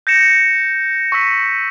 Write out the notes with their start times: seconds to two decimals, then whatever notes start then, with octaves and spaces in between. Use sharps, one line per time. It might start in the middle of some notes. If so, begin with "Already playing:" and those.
0.07 G6 A#6 C#7 E7
1.12 C#6 E6 B6